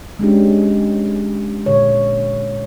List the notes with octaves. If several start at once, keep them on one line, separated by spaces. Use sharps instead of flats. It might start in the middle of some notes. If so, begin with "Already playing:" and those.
G#3 C#4 D4 G4
A#2 D3 C#5